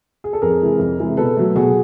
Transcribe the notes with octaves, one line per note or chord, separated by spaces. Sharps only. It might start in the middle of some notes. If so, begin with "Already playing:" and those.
G#4
A4
F2 G#4 A#4
C3 E3 G#3
F2
C3 E3 G#3
B2 A4 B4
F#3 A3
B2 F#4 G#4